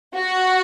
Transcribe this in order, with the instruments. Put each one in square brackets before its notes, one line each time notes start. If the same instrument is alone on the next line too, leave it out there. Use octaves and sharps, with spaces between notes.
[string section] F#4